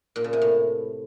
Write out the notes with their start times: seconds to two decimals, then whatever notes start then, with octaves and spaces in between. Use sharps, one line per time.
0.16 A#2
0.24 C#3
0.33 C3
0.42 A2